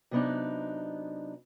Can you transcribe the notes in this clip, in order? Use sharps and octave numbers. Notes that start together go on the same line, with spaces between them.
C3 F#3 B3 C4 D4 D#4